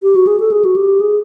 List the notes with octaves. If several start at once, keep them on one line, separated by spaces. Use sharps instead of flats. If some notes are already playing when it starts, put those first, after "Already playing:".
G4
F#4
G#4
A4
G#4
F#4
G4
G#4